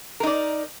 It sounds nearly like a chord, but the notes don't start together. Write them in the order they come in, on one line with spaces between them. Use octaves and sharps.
A#4 D#4 D5